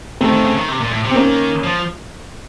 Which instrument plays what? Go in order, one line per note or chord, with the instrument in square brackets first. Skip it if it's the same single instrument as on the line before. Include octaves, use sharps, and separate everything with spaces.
[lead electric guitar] D#3 [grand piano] A3 C4
[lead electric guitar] D#3
C#3
D#3
C3
A#2
A2
C3
[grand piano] C4
[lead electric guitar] D#3 [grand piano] A#3 C#4
[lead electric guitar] F3